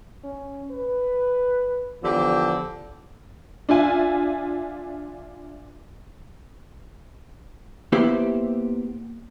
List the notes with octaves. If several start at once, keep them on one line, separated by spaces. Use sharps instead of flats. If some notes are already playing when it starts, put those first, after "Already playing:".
C#4
B4
E2 D3 F3 G4
D4 F4 E5 G#5
A#3 B3 E4 G4 C5